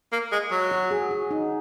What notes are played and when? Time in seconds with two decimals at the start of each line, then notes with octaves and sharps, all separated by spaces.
0.12 A#3
0.32 G#3
0.51 F#3
0.71 F#4
0.91 G#4
1.11 F#4
1.31 D#4